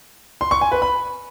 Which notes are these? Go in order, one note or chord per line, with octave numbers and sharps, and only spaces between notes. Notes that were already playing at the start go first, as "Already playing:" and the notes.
C6
C#6
G#5
B4
B5